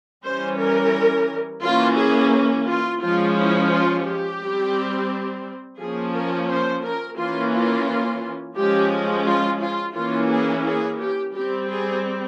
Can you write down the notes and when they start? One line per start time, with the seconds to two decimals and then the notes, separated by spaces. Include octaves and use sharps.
0.24 E3 G3 C#4 C5
0.59 A#4
1.63 E3 A#3 C#4 F4
1.97 G#4
2.67 F4
3.01 F3 G#3 C#4 F4
3.37 E4
3.71 F4
4.06 G4
4.40 G3 C4
5.79 F3 A#3 C#4 G#4
6.14 A#4
6.48 C5
6.83 A#4
7.18 E3 A#3 C#4 F4
7.52 F4
8.56 F3 G#3 C#4 G4
9.25 F4
9.60 F4
9.95 E3 A#3 C#4 F4
10.30 G#4
10.64 G#4
10.99 G4
11.33 G3 C4 G4
11.69 G#4